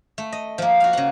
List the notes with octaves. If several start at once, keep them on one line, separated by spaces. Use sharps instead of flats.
A3
D#5
F3 A#3
F#4 F5
C#3 F#5